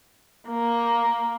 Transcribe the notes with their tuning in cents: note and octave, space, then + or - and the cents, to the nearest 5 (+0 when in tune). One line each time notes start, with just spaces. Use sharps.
A#3 +5